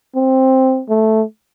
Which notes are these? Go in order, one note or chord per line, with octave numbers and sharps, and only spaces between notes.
C4
A3